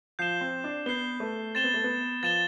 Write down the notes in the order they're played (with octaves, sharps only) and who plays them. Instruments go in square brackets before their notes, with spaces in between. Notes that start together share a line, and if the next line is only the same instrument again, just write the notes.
[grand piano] F3 [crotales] G6 C7 E7 G7
[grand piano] C4
D4
[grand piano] B3 [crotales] G6 C7 E7 G7
[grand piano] A3
[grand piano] C4 [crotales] A6 E7 G7
[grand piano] B3
A3
B3
[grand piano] F3 [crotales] A6 E7 G7